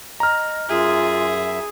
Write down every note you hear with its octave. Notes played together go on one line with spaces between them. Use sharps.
D#5 A#5 F6
F#2 F4 G#4 E5